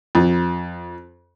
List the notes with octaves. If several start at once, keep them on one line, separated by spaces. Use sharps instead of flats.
F2